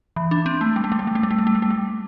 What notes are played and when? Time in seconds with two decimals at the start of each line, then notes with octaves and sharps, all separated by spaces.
0.16 E3
0.31 D4
0.46 C4
0.61 A3
0.76 G3
0.84 A3
0.92 G3
0.99 A3
1.07 G3
1.15 A3
1.23 G3
1.31 A3
1.39 G3
1.47 A3
1.55 G3
1.62 A3
1.70 G3